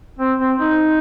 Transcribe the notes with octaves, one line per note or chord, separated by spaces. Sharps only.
C4
C4
D#4